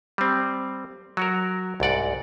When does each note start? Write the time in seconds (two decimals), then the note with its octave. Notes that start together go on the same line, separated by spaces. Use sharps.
0.18 G3 C4
1.17 F#3 F#4 A#4
1.80 C2 G#2 D5 F#5